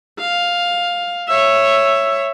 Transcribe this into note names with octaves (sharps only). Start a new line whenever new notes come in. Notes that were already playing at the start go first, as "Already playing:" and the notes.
F5
C#5 E5